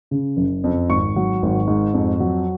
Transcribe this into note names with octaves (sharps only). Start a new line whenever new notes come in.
C#3
F#1
F2
G#1 C#6
F#3
G#1
G#2
F2
F#3